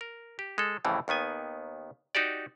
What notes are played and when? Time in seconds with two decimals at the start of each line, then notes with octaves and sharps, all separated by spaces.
0.01 A#4
0.39 G4
0.58 G#3 A4
0.85 F2 A2 C#3 E3 G3
1.08 D#2 D#3 B3 G#5
2.15 D#4 F#4 G4 D5